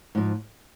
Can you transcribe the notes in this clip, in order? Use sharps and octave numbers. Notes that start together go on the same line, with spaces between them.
G#2 F3